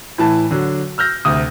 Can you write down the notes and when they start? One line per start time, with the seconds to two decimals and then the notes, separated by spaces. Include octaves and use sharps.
0.18 A2 E3 A5
0.51 D3 F#3
0.98 E6 F6 G6 A#6
1.25 D2 C3 D#6